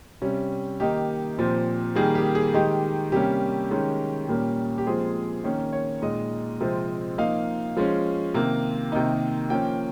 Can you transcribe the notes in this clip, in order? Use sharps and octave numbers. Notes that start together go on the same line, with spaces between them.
C3 G3 C#4
D#3 A#3 D#4 G4
A#2 F3 C4
D#3 G3 A#3 G#4
G4
G#4
D#3 G#3 D#4 G4
C3 G3 A#3 C#4 G4
D#3 G#3 C#4
A#2 G3 A#3 C#4
G4
A#2 F3 G#3 C4 G#4
D#3 A#3 C#4
C#5
A#2 G#3 D#4 D#5
C3 F3 G#3 C4
F3 A#3 D#4 F5
F3 G#3 C#4
C3 D#3 A#3
C3 D#3 A#3 D#4
F3 A#3 C#4 G5